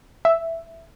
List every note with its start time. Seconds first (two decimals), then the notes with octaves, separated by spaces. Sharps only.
0.25 E5